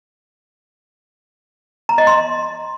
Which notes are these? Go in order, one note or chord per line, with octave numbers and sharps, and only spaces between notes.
A#5
D#5
C6